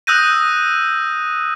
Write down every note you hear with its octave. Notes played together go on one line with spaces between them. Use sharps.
D#6 E6 F#6 G6 A#6 D#7